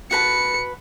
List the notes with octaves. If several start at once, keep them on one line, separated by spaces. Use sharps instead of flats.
F#4 B4 A5 C#7